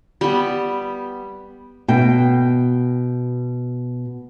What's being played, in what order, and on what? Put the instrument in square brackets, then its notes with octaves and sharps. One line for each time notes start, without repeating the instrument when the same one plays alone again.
[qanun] G3 B3
[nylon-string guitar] B2 G5